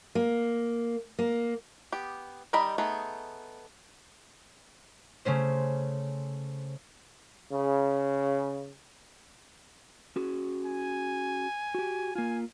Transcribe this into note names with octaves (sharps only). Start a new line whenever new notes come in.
A#3
A#3
B3 G4
D#3 G3 D#4 D#5 B5
A3 B3 D#4 G#4
C#3 A3 C#4 C5
C#3
C#4 F#4 G#4
G#5
F#4 G4
A#3 F4 G#5